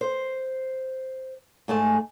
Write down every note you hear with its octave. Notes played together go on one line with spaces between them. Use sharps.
C5
G#2 A3 G#4 A5